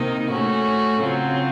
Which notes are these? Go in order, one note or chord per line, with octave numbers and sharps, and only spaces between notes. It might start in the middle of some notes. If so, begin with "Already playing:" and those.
Already playing: C3 D#3 A#3 D#4
A2 A3 C#4 F#4
C#3 F#3 C4 F4